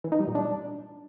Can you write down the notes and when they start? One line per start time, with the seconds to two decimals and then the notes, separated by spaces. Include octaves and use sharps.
0.04 E3
0.12 D#4
0.20 G3
0.27 A#2
0.35 D4